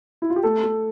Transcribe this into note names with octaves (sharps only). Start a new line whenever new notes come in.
E4
F4
G4
A3 A4
A3